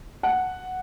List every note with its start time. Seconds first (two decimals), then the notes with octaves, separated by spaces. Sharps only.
0.23 F#5